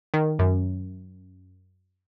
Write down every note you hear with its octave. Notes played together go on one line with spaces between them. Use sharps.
D#3
F#2